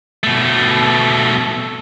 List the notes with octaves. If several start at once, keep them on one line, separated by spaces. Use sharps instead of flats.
B2 A3